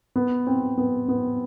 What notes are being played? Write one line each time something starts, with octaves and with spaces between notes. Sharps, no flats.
B3
C4
B3
B3